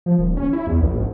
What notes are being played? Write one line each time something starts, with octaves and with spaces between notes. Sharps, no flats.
F3
D#1
C#4
E4
E2
A#1
G#1